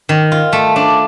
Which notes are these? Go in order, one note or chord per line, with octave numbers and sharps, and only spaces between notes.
D#3
F4
A3
D4